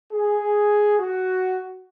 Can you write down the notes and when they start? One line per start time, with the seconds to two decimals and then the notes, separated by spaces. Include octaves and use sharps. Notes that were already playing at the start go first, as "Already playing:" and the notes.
0.12 G#4
0.99 F#4